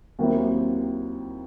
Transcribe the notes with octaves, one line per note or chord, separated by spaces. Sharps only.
D#2 D#3 F#3 C4 E4